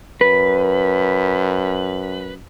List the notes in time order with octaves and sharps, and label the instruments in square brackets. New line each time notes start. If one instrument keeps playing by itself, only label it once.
[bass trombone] F#2 [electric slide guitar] B4